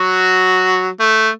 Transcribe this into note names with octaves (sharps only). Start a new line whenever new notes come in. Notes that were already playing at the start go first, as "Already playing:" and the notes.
Already playing: F#3 F#4
A3